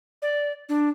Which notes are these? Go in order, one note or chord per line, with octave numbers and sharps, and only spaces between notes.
D5
D4